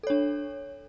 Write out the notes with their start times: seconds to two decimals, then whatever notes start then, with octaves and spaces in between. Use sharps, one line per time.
0.03 A4
0.07 C#5
0.10 D4